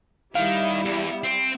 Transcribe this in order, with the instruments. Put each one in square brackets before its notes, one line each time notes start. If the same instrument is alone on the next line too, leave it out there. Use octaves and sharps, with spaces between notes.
[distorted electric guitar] D#3 [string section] G3 E4 [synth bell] F5
[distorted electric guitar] E2
C4